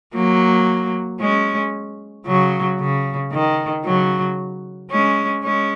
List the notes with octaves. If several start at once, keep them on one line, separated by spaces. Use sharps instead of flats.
F#3 A#3
G#3 C#4
C#3 F#3
C#3
D#3
C#3 F#3
G#3 C#4
G#3 C#4